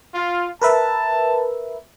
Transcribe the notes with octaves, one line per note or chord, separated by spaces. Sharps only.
F4
A#4 B4 E5 A5